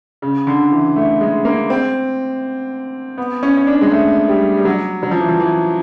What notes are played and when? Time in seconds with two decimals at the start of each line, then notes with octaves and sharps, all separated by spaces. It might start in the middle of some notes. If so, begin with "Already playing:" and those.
0.22 C#3
0.47 D3
0.72 E3
0.96 A3
1.21 G#3
1.45 A#3
1.70 C4
3.18 B3
3.43 C#4
3.57 C#4
3.67 D4
3.81 G#3
3.91 A3
4.29 G3
4.58 G3
4.65 F#3
5.03 F#3
5.11 F3
5.20 E3
5.29 F3
5.40 E3